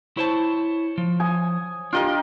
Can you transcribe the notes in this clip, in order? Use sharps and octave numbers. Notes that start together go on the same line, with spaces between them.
E4 C5 C#5 A5
F3
G#5 D#6
D4 F4 G4 A#4 D#5